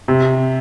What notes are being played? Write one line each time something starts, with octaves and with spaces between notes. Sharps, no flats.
C3